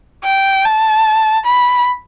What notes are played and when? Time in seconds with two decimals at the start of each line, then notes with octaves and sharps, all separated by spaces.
0.25 G5
0.65 A5
1.46 B5